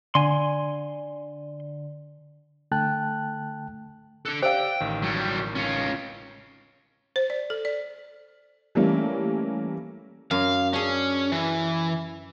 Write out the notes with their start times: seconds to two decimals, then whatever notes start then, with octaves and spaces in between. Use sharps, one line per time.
0.15 D3 G#5 C6
2.72 D3 A3 G5 A5 F#6
4.25 D4 A4 F#6
4.43 G4 C5 D5 F5 G5 E6
4.80 A1 D#3
5.02 F#3 G3
5.55 C#4 F4
7.16 C5
7.30 D5
7.50 A4
7.65 D5
8.75 E3 G3 A3 A#3 C#4
10.31 F#2 F5
10.73 C#4 D4 G#4
11.32 E3